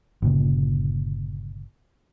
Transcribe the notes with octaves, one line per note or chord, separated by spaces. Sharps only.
G1 A#2 C#3